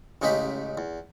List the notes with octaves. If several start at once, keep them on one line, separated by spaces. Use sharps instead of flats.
A1 C#3 G#3 D#4 G4 B5
E2